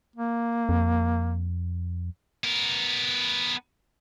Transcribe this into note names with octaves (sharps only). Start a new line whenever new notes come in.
A#3
F2
B3 A#4